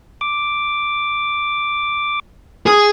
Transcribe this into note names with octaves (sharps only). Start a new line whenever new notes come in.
D6
G#4